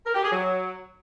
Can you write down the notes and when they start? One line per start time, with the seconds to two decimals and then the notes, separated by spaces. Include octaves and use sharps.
0.05 A#4
0.14 G4
0.22 G#4
0.31 F#3